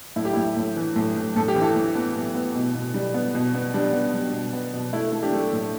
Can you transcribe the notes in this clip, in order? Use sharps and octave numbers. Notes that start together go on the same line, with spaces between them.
A2 E4
G4
A2 E4
A2
E3
A2
A2
A2 A4
G4
E3
E4 A4
A2
B3
A2
B3
B2
B2
G3
B3
B2
B3
G3 D4
B3
G3
B2
B3
B2
A3 E4
A3
D4 G4
A3
A2